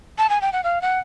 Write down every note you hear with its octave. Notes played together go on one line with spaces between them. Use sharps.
A5
G#5
G5
F#5
F5
F#5